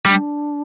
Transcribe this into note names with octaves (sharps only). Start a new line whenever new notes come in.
G3 D4